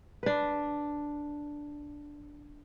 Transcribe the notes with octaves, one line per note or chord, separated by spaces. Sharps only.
D4 B4